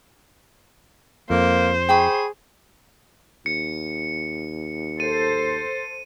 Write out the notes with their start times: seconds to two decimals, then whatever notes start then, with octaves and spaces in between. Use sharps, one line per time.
1.30 F2 A#3 C5
1.89 G#4 G5 B5 C#6
3.46 D#2 C#7
5.00 A4 C5 D#7